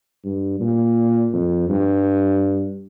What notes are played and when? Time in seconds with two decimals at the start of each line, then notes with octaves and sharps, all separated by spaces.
0.24 G2
0.61 A#2
1.33 F2
1.69 G2